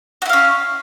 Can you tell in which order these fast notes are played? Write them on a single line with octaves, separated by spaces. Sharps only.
F#4 E4 F5 C#4